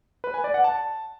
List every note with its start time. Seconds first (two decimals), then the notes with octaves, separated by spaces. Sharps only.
0.24 B4
0.34 G#5
0.44 D5
0.54 F#5
0.64 A5